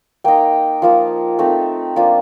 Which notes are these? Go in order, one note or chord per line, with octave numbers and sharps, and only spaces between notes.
A#3 D#4 G5
F3 A#3 F4
A3 C4 D#4
F3 A#3 D4 F4